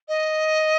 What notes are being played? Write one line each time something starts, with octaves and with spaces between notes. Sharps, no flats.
D#5